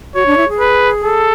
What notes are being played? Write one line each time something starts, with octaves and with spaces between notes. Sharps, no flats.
F#4 C#5
D4
E4
G#4
B4
A4